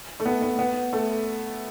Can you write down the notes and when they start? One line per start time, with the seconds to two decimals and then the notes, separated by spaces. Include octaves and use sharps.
0.20 A3
0.26 B3
0.42 B3
0.59 B3
0.93 A3